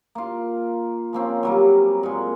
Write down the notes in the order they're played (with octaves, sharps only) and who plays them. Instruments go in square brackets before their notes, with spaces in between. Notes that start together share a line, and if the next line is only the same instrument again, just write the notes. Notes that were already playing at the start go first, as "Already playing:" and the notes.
[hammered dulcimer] A#3 F4
F3 A#3 C4 C#4
F#3 G3 A#3
A#2 G#3